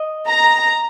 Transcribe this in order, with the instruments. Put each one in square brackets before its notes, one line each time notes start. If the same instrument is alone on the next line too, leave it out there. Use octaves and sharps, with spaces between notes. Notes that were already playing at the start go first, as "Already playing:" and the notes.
Already playing: [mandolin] D#5
[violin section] A#5